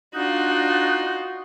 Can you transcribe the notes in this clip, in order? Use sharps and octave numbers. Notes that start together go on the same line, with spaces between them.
D4 D#4 F4 F#4 F#5 F#6